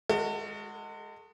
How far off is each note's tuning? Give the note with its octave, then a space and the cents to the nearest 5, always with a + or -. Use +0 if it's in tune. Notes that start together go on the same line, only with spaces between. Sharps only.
G#3 +0 F#4 +0 A4 +45